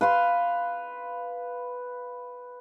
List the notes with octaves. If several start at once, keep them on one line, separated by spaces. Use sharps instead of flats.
B4 F5 C6